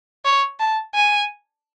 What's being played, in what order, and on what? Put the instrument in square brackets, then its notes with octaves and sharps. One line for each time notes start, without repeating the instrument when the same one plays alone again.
[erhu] C#5
A5
G#5